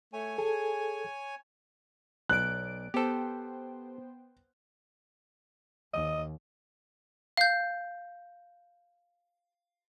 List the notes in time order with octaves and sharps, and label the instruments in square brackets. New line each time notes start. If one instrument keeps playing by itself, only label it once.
[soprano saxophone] A3 [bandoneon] C#5 G#5
[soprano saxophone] G#4 [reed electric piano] A4
[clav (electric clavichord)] B1 [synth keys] D5 D7 [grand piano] F#6
[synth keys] B3 C5 G5 [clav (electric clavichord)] G4 A4
[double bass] D#2 [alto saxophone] D#5
[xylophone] F5 G6